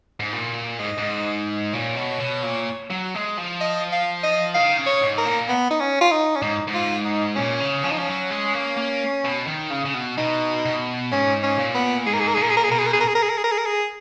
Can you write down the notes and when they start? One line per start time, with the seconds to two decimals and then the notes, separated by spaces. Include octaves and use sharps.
0.20 G#2
0.33 A#2
0.79 G#2 D#5
0.98 G#2
1.73 A#2 C#5
1.96 B2
2.20 B2
2.43 A#2
2.90 F#3
3.14 G#3
3.37 F3
3.61 D#5
3.92 F5
4.23 D#5
4.54 D#3 F5
4.78 C#3
4.86 C#5
5.01 G#2
5.18 A#4
5.25 A#2
5.49 B3
5.70 D#4
5.80 C#4
6.01 F4
6.12 D#4
6.36 C#4
6.42 G#2 D#4
6.68 G#2
6.74 F4
7.05 D#4
7.36 A#2 C#4
7.60 C#3
7.83 F3 C#4
7.91 D#4
7.99 C#4
8.07 F#3
8.30 G#3
8.54 A#3
8.77 A#3
9.25 B2
9.47 D#3
9.70 C#3
9.85 C#3
9.94 B2
10.18 B2 D#4
10.65 B2
11.11 G#2 C#4
11.43 C#4
11.58 A#2
11.75 B3
12.06 G#2 G#4
12.13 A#4
12.20 G#4
12.28 A#4
12.35 A#2 G#4
12.43 A#4
12.50 G#4
12.57 A#4
12.64 G#4
12.69 B2 A#4
12.79 G#4
12.87 A#4
12.93 G#4
13.00 A#4
13.08 G#4
13.15 A#4
13.23 G#4
13.30 A#4
13.38 G#4
13.44 A#4
13.52 G#4
13.58 A#4
13.66 G#4